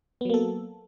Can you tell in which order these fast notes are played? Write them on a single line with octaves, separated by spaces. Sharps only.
B3 F#3 A#3 A4